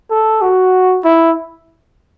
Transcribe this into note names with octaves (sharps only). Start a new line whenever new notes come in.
A4
F#4
E4